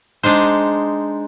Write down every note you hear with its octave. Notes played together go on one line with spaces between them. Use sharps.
G#3 D4 D#4 C5